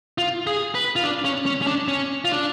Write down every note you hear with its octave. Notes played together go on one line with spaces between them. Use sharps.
F4
G#4
B4
F4
D4
C#4
C#4
C#4
D4
C#4
F4
D4